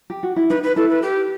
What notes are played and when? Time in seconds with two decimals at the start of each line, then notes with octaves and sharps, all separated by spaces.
0.10 G4
0.23 F#4
0.36 E4
0.50 D#4 B4
0.63 B4
0.76 E4 A4
0.90 B4
1.02 G4